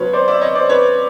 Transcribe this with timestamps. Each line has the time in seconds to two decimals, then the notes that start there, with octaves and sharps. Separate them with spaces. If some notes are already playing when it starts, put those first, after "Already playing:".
Already playing: C#2 B2 F#3 B4 C#5
0.13 C5 D5
0.28 D5 E5
0.41 C#5 D#5
0.55 C5 D5
0.69 B4 C#5